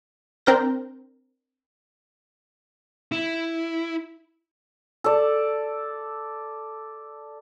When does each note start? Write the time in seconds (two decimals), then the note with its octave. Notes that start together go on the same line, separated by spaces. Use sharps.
0.46 C4 D4 A#4 G6 A#6
3.12 E4
5.04 A4 D5